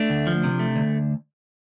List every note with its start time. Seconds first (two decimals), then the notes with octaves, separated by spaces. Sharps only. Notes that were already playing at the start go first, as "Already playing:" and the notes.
Already playing: A3 D4
0.10 D2
0.27 F3
0.44 C3
0.59 A3
0.76 D2